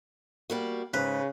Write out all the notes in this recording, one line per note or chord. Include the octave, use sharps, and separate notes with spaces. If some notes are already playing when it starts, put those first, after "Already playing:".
G3 A#3 F#4
G#2 C#3 B4